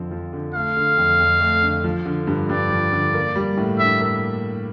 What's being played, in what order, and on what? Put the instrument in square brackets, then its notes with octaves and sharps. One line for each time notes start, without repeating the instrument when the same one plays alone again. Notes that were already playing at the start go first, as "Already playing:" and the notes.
Already playing: [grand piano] F2 D3 F3 C4
F3
D3
[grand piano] A3 [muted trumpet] F5
[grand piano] D3
F2
F2
A3
D3
F3
D3
G2
[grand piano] G2 [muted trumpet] D5
[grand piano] F3
D3
A#3
G3
A2
[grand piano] D4 [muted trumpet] E5
[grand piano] A#3